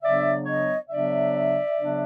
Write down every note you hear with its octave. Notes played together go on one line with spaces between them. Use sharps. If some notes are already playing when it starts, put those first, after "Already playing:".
C#3 F#3 B3 D4 D5 E5
C#5 D#5
C#3 F#3 B3 D4 D5 E5
C#3 F#3 B3 D4